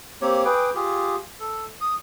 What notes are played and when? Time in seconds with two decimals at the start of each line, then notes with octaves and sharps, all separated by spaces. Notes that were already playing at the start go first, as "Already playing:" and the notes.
0.22 A#3 C4 G4 C#5
0.45 G#4 B4 G5 D6
0.75 F4 G4 G#4
1.40 A4
1.81 D#6